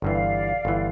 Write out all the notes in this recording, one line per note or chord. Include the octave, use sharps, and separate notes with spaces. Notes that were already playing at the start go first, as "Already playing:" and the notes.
G1 G2 E3 D5 F5
G1 E3